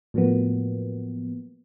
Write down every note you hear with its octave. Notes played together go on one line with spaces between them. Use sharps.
A2 F3 F#3 A#3 B3